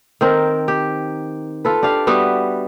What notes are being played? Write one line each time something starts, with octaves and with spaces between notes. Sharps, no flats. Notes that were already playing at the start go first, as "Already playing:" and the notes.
D#3 C4 A#4
G4
F4 A4 B4
D4 G4 D5 F5
G3 B3 F#4 E5